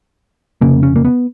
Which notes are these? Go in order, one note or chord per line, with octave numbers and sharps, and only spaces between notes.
F1 F2 C#3 A#3
C#4
A#3
B3